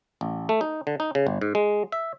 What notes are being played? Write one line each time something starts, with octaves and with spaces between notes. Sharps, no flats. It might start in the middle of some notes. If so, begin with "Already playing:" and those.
A1
A3
D#4
D3
D#4
C#3
G1
G#2
G#3
E5